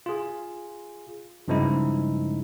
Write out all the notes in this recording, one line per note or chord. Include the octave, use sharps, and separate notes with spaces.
F4 G#4
G2 C#3 F3 G#3 D#4 E4